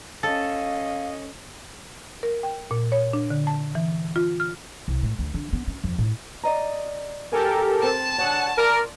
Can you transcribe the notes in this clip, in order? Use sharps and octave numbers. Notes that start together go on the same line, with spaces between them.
C#4 A4 D#5 F5
A#4
G5
A#2
C#5
D4
D3
A5
E3
F4
F6
C2
A2
D2
D3
B3
C#4
F2
A2
D5 D#5 A#5
G2 F#4 G4 A4 A#4 G#5
C4 A5
D3 G#4 C#5 F#5
F4 A#4 D5